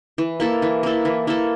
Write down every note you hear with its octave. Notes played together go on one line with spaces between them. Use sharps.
E3
A#3 E4 A4
E3
A#3 E4 A4
E3
A#3 E4 A4